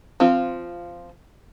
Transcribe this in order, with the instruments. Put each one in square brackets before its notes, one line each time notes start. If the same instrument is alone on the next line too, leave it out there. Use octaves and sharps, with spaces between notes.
[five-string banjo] F3 C4 F4